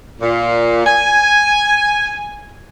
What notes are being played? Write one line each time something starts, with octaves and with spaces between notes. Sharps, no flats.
A#2
G#5